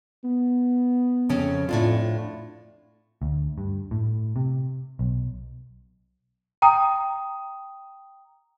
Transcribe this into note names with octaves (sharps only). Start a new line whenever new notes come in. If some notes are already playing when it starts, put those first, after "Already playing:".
B3
F2 C#3 C#4
F2 A2 D4 F4
D2
G2
A2
C3
B1
G5 A#5 D#6